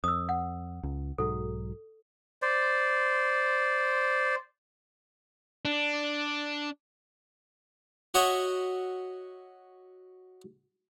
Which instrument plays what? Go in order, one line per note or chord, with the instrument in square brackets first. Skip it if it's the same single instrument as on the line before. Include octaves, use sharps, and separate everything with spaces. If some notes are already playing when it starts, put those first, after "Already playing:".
[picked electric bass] F2 [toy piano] D#6 E6
[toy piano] F#5
[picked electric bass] C#2
[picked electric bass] B1 G#2 F#3 [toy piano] A4
[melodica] C5 D5
[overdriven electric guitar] D4
[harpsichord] F#4 C#5 D#5 E5